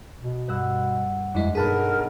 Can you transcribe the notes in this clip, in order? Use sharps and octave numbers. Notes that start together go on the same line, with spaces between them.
B2
G2 F#5 E6
F2 G3 G#3 D4 E4
B1 G2 F#4 G#4 A#4 A5 B5 B6